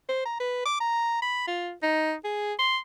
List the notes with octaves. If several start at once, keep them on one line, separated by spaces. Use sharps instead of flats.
C5
A#5
B4
D6
A#5
B5
F4
D#4
G#4
C6